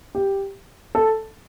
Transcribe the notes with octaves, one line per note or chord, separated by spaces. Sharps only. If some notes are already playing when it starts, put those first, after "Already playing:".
G4
A4